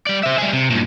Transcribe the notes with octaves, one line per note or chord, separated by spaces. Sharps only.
G3 D5
C5 E5
G3 G#4
C3
G2 A#2